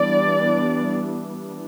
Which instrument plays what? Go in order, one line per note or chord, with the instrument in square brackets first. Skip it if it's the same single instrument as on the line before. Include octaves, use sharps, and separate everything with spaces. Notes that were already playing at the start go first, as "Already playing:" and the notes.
Already playing: [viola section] E3 G3 B3 D4 D5